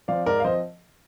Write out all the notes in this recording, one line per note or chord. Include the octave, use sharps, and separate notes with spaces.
F3 C4 D5 F5
G#2 A#4 D5
F5
F3 C4 C5 D#5